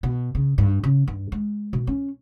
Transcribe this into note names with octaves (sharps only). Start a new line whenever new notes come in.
B2
C#3
G2
C#3
G2
G#3
B2
C#4